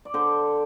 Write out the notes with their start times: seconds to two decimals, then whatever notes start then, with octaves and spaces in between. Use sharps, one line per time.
0.05 D5
0.14 D3 A4 C5